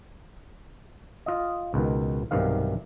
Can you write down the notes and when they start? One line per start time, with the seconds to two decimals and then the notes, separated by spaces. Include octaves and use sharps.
1.26 F4 D#5
1.74 C#2 B2 D#3
2.31 B1 G2 C3 D#3 F5